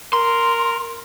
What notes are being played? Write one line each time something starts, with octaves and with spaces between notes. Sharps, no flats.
A#4 C6